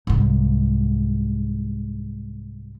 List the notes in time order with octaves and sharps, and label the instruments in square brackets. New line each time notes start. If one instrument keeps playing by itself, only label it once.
[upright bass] C2 G#2